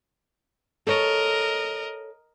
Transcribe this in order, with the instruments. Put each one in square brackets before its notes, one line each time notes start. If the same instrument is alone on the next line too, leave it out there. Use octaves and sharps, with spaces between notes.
[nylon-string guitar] A4 C#5 [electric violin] A#4 D#5